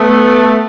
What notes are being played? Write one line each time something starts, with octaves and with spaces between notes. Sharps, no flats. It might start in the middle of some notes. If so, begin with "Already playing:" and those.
Already playing: A3 B3